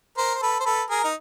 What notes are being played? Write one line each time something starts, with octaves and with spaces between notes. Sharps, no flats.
A#4 C5
C5
A4 B4
C5
A4 B4
G#4 A#4
D#4